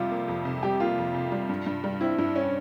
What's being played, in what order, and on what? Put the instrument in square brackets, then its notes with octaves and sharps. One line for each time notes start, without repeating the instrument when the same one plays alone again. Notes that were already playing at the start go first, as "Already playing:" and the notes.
Already playing: [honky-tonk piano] F2 C3 G3 [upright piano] F4
[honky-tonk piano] A#3
F2
C3
[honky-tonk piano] G3 [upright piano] G4
[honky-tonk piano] A#3 [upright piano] F4
[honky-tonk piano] F2
C3
G3
G2
G2
G3
[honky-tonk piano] C4 [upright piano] E4
[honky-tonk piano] G2 [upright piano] E4
[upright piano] C#4